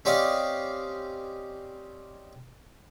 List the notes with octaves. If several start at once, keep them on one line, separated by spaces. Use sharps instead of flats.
C4 C#4 G4 D5 D#5 F5